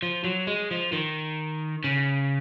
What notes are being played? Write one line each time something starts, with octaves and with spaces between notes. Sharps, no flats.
F3
F#3
G#3
F3
D#3
C#3